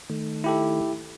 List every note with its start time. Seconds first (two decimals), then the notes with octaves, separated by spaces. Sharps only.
0.10 D#3 A3
0.44 E4 G4 A4